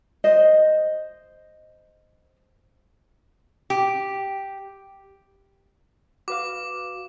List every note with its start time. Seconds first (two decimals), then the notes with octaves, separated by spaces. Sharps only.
0.24 C5 D#5
3.70 G4
6.28 F#4 B4 F5 D6